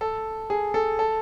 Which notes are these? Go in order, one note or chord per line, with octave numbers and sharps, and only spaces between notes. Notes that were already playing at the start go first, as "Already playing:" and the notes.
A4
G#4
A4
A4